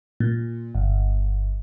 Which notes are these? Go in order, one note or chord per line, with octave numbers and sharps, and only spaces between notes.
A#2
G1